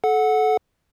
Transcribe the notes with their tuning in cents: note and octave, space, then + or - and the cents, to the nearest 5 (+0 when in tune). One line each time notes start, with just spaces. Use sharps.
A4 -25 F#5 -10